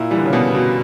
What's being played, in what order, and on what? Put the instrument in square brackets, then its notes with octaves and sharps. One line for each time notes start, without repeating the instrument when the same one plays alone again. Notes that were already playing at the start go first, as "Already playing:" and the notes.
Already playing: [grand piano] A#2 [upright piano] E4
[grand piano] E3 [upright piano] G3
[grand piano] D3
C#3
[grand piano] B2 [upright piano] B3
[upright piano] B2